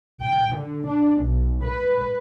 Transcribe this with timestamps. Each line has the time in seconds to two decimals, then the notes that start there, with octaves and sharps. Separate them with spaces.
0.22 G5
0.57 D3
0.88 D4
1.24 B1
1.64 B4